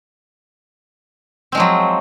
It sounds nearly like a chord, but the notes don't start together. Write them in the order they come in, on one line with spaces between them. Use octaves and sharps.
C4 G#3 F3 F#3